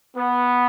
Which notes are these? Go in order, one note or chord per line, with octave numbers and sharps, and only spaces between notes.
B3